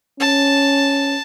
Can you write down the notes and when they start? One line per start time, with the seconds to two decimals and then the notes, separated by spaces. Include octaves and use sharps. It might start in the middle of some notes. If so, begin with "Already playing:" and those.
0.20 C#4 A5